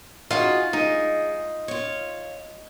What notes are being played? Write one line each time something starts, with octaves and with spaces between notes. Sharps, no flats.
D#4 F4 F#4 G#4
G#3 D#4
F4 C#5